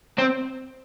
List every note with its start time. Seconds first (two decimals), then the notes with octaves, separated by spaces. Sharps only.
0.18 C4